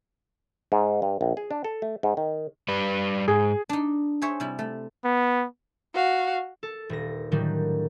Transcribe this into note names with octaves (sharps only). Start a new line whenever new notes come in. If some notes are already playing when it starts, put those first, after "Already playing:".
G#2
G2
A#1
G#4
D4
A4
A3
G#2
D#3
G3 B4
G#2 G#4
D4 D#4
G#4 C5 C#5 E5
C3 G3 E4
A3
B3
F#4 F5
A4
D#1 A#6
A2 D3 D#3 F#3 G3